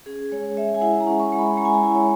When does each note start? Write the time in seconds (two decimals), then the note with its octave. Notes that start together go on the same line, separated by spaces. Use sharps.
0.06 C#4 G#4
0.32 G#3 C#5
0.57 G#3 E5
0.74 G#5
0.81 E4 F#5
1.00 A#5
1.07 C#4
1.20 C#6
1.32 G#3
1.38 B5
1.57 G#3 A#5
1.65 G#5
1.74 A#5
1.83 E4
1.95 C#5